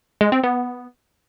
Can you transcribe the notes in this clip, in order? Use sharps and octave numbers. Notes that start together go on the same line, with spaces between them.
G#3
C4
B3